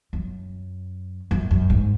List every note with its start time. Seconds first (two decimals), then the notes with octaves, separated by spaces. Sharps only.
0.13 F#2
1.31 F#2
1.51 F#2
1.70 G#2